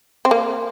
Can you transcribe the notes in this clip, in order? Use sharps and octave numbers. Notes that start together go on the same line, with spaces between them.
C4
A#3